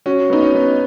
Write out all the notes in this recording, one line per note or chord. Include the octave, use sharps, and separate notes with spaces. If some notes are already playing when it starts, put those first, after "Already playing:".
C#4 F#4
B3 D#4
C#4
B3